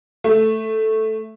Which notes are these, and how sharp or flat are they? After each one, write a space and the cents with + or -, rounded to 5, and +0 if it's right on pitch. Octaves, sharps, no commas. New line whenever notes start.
A3 +0